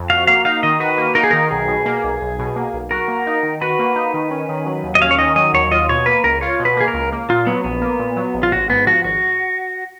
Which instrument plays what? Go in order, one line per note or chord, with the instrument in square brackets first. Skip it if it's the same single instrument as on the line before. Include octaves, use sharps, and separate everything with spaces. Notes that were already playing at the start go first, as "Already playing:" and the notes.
Already playing: [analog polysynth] F2
[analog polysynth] F#4 [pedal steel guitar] F5
[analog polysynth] A#3 [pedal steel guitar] F5
[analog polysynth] D#4 [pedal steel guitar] F5
[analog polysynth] D#3 [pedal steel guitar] D#5
[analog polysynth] F#4 [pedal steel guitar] B4
[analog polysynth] A#3
[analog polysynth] D#4 [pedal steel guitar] A#4
[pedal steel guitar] G#4
[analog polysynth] D#3 [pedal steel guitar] A#4
[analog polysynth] B1 [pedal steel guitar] G#4
[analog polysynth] B2
A#3
B1
B1
B2
A#3
B1
[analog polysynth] F#4 [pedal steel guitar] A#4
[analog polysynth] A#3
D#4
D#3
[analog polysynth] F#4 [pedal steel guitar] B4
[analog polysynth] A#3
D#4
D#3
C#4
D#3
F#3
D#2
[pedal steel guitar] D#5
[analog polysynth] C#4 [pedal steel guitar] F5
[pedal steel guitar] C#5
[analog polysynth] D#3 [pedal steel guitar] D#5
[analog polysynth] F#3 [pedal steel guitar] D#5
[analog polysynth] D#2 [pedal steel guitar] C#5
[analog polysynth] F4 [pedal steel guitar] D#5
[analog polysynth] B2 [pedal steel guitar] C#5
[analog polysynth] A#3 [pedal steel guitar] B4
[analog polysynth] C#2 [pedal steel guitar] A#4
[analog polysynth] F4 [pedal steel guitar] C#5
[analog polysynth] B2
[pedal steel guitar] B4
[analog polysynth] A#3 [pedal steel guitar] G#4
[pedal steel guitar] A#4
[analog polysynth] C#2
A#3
[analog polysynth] A#2 [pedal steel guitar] F4
[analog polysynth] F#3 [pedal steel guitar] B3
[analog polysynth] A#1 [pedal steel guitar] B3
[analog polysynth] A#3
A#2
F#3
A#1
[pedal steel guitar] F4
[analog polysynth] G#1 [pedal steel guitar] F#4
[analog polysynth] G#2 [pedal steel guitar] B3
[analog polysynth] F3 [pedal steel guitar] F#4
[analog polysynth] G#1 [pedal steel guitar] F#4